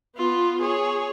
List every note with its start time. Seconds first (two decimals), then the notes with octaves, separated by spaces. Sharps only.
0.17 B3 F4
0.61 G#4 C#5